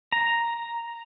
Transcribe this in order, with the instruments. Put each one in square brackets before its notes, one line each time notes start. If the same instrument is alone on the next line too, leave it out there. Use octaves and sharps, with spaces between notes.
[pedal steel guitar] A#5